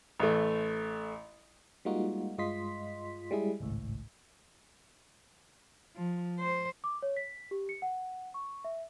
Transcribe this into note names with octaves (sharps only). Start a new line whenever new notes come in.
A1 A3
G3 G#3 A#3 D#4 F4 F#4
G2 G#3 F4 D#5 C6 B6
G3 G#3 E4 G#4
G#1 C#2 A2
F3
C5
D6
C#5
B6
G4
C#7
F#5
C#6
E5